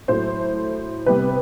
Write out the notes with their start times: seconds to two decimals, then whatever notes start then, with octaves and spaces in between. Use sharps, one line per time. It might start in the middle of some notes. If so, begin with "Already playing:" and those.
0.08 A2 F#3 A3 C5
1.06 C3 G3 B3 B4